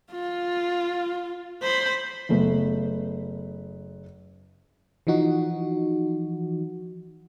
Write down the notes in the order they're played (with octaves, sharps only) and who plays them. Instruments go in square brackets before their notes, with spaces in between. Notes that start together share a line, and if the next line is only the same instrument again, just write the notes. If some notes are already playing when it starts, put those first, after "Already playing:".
[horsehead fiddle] F4
C5 B5
[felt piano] F#1 A3 B3
[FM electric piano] E3 F3 D#4 F#4